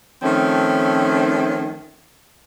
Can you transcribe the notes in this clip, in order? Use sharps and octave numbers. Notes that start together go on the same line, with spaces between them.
D#3 F3 A3 C4 C#4